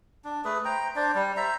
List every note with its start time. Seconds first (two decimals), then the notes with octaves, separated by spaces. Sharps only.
0.25 D4
0.45 A3 G#4 B4
0.65 C5 G5 A#5
0.96 D4 C5 D5
1.15 G3
1.37 C5 E5 A#5